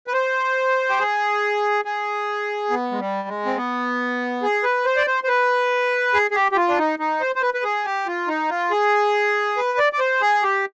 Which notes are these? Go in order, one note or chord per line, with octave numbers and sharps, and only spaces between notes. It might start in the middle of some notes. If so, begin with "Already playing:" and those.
B4
C5
G4
G#4
G#4
B3
G#3
G3
G#3
C4
B3
G#4
B4
C5
D5
C5
C5
B4
G#4
G#4
G4
G4
F4
D4
D#4
D#4
C5
C5
B4
B4
G#4
G4
F4
D#4
F4
G#4
B4
D5
D5
C5
G#4
G4